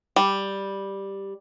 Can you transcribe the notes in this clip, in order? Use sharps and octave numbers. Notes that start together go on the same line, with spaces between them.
G3